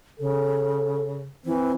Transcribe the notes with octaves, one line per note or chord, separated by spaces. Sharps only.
C#3 A4
E3 C4